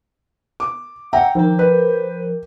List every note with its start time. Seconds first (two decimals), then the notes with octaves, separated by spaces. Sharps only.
0.60 D6
1.13 E5 F#5 G5 A#5
1.35 D#3 F3 A#4 C5
1.59 B4